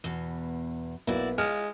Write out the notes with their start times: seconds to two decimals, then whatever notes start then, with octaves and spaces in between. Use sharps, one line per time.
0.04 E2 B2
1.07 B1 A#3 E4 F#4 B4 D5
1.38 G#3 F4 F6